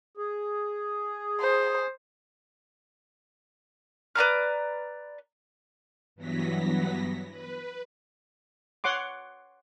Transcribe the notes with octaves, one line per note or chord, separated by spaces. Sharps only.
G#4
C5
B4 D5 A#5 F6
G2 E3 F#3 B3 A#6 B6
B4
C#5 F#5 C6 D6